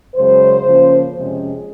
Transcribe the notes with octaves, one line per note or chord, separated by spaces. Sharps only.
F#2 C#3 G#3 C5
C#3 F3 A#3 C#4
F2 C3 F3 G#3 C#4 G#4